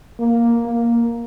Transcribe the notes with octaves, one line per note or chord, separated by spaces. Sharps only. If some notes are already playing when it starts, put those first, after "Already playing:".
A#3
A#3